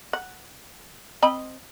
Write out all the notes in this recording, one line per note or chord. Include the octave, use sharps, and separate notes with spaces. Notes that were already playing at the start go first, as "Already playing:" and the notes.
F#5
C4 D#5 B5